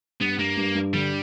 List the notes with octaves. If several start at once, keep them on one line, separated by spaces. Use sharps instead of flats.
G2 B3
G2 A#3
G2
G2
D3 G3